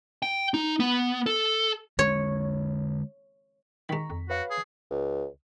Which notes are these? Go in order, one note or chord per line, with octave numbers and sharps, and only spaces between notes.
G5
D#4
B3
A4
D3 G#3 D4 C#5
D#3 G#3 A#5 C#6 B6
F2
F#4 B4 C#5 F5
G#4
C#2